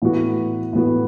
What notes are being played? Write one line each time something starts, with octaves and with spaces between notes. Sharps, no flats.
A2 E3 B3 F#4
A2 E3 B3 F#4